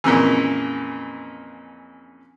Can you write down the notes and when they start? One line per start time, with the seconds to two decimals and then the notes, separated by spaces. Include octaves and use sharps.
0.04 F2 A#2 C#3 E3